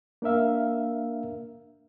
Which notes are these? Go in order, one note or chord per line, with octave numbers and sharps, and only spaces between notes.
A#3 D4 A#4 E5 F5